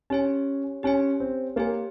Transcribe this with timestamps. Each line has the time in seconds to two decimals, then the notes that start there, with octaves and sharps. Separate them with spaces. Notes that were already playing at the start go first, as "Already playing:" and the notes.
0.10 C#4 G4 C#5 G#5
0.83 C#4 G4 C#5 G#5
1.20 C4
1.56 A#3 G4 C#5 G#5